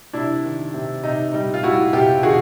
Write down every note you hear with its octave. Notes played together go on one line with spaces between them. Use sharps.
C3 D4 E4
D#3
C3
C3 D#4
G3 D#4
F4
G3 E4 F#4
C3 F4 G4
D#3 F#4 G#4